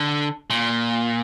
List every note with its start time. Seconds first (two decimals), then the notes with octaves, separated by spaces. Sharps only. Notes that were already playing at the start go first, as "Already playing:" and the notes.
Already playing: D3
0.50 A#2